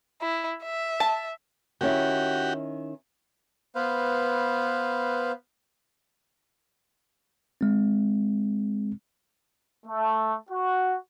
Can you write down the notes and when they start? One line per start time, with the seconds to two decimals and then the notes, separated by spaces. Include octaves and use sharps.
0.21 E4
0.64 E5
1.00 A5
1.81 D#3 C#4 E4 F#4 G4
3.75 B3 B4 C5 F5
7.61 G#3 C4
9.87 A3
10.49 F#4